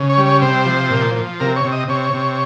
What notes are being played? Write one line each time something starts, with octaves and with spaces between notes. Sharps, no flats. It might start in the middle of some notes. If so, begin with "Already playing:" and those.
Already playing: C#3
C#5
G3
C#5
C3 C5
F3
A#2
F3
C3 A#4
C#5
C3
D#5
C3 C#5
C3